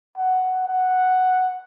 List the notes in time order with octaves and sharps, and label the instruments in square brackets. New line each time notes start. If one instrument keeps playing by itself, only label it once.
[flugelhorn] F#5
F#5